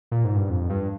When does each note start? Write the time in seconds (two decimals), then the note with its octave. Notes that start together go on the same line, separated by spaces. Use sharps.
0.12 A#2
0.25 G#2
0.36 G2
0.50 F2
0.70 G2